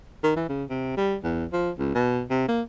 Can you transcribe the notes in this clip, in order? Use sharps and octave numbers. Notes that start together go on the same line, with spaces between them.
D#3
E3
C#3
C3
G3
E2
F3
C#2
B2
C3
A#3